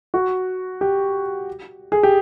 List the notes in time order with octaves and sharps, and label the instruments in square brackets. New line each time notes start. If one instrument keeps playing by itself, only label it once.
[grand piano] F#4
G4
G#4
G4